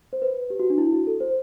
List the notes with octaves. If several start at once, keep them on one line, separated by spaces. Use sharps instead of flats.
C5
B4
G4
F#4
D4
E4
F#4
A4
C5